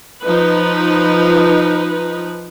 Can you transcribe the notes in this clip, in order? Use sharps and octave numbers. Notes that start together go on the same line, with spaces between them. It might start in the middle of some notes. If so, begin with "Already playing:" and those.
F3 D#4 B4